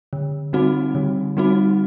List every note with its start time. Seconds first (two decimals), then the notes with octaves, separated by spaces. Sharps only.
0.13 D3
0.53 G3 C4 D#4 F#4
0.95 D3
1.37 G3 C4 D#4 F#4